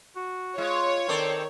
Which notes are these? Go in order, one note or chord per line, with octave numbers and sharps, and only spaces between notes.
F#4
G#3 F4 C#5
D#3 C4 A4 D5